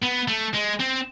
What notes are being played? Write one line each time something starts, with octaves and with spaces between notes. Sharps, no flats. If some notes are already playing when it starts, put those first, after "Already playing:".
B3
A3
G#3
C4